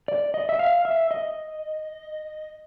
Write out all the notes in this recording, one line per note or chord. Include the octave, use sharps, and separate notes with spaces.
D5
D#5
E5
F5
E5
D#5